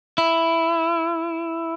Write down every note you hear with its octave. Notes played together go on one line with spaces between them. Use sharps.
E4